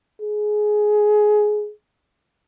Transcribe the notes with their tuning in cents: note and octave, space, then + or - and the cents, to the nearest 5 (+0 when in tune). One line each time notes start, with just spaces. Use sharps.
G#4 +15